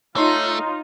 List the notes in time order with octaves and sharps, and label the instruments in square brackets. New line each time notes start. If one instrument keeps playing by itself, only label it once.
[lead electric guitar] A3 [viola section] D#4 F4 [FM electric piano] C#5 A#5 C6